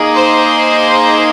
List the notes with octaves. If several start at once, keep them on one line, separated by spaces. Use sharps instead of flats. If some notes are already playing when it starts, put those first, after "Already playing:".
Already playing: A#3 D#4 G#4
C5